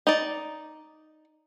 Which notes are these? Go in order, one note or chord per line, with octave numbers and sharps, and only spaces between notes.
D#4 D5